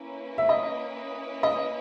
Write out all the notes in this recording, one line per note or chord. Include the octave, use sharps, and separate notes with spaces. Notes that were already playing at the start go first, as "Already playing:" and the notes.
Already playing: A#3 C#4 E4 B4
E5
D#5
D#5